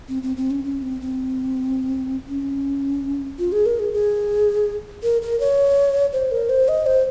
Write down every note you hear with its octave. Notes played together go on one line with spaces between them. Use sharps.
C4
C4
C4
C#4
C#4
C4
C4
C#4
F4
G#4
A#4
G#4
G#4
A#4
A#4
C#5
C5
A#4
C5
D#5
C5